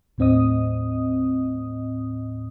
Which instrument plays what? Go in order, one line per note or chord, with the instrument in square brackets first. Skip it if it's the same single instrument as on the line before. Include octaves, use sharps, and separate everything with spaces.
[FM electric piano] D#2 A2 C4 D#5 D#6